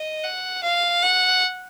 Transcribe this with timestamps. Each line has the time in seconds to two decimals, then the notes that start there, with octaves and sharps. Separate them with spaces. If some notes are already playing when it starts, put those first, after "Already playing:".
Already playing: D#5
0.24 F#5
0.63 F5
1.03 F#5